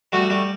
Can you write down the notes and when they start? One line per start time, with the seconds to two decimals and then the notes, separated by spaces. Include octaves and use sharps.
0.12 G3 A3 F#4
0.30 G3 A3